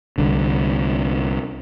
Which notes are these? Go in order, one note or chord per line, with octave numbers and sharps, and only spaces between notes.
C2 D3